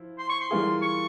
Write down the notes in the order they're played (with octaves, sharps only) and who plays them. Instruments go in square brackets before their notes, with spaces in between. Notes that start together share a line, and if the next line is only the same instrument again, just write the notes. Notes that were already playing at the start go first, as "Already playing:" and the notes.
Already playing: [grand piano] F3 E4
[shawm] C6
C#6
C6
[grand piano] E3 G3 A#3 F4 G#4
[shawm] C#6